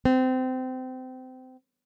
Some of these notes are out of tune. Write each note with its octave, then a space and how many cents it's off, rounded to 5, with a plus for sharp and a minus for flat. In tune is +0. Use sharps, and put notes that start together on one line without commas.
C4 -25